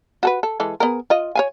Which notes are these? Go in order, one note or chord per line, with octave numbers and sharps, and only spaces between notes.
F#4 A4 B4
A4
E3 G#3 A4
B3 G#4 A#4
F4 D#5
C#5 F5 G#5